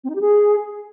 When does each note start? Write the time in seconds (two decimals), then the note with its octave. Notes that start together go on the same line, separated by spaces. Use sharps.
0.04 C4
0.10 D#4
0.15 G4
0.21 G#4